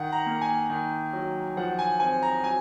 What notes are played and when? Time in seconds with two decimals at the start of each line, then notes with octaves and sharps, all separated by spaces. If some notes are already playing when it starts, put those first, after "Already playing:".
Already playing: D#3 F#5
0.12 A#5
0.26 A#3
0.41 G#5
0.70 D#3
1.13 F#3
1.57 F3 F#5
1.79 G#5
2.00 C4 G#5
2.22 A#5
2.44 F#3 G#5